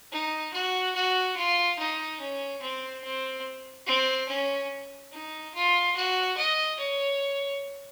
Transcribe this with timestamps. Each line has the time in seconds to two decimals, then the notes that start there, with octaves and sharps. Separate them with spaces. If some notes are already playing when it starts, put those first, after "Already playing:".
0.12 D#4
0.54 F#4
0.95 F#4
1.37 F4
1.79 D#4
2.20 C#4
2.62 C4
3.04 C4
3.87 C4
4.28 C#4
5.12 D#4
5.54 F4
5.96 F#4
6.37 D#5
6.79 C#5